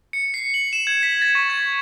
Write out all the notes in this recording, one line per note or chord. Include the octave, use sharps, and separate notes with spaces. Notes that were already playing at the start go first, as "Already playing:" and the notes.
C#7
C7
F#7
E7
G#6
B6
A6
C#6
G#6